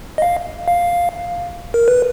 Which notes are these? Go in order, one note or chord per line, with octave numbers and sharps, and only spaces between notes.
D#5
F5
F5
A#4
B4